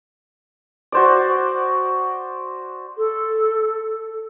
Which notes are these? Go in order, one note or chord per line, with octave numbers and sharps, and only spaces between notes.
F#4 C5 D5
A4